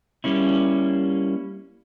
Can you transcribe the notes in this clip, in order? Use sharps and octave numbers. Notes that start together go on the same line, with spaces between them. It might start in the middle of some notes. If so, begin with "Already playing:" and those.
G3 A#3 C#4 E4